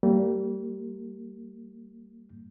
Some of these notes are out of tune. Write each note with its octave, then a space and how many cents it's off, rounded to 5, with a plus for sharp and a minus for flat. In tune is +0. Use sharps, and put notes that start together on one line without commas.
G3 -20 A#3 -35